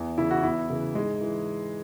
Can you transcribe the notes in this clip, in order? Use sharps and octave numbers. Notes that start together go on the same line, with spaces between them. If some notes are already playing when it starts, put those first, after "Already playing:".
Already playing: E2
C#3 E3 E4
F#4
E2 E4
C#3 E3
G#2 G#3
E3